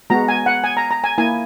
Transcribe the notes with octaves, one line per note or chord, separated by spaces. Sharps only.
G#3 B3 F#4 A#5
G#5
F#5
G#5
A#5
A#5
G#5
A#3 E4 G#5